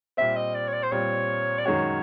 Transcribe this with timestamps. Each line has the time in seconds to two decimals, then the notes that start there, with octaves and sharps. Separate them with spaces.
0.17 A#2 G3 C4 E5
0.36 D#5
0.55 D5
0.68 C#5
0.73 D5
0.83 C5
0.91 A#2 G3 C4 C#5
1.59 D5
1.65 F#2 D#3 G#3 C#4 F#4 C#5